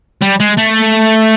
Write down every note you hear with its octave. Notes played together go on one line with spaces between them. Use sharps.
G3
G#3
A3